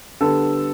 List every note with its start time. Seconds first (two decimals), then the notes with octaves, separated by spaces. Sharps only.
0.20 D3 G3 B3 A4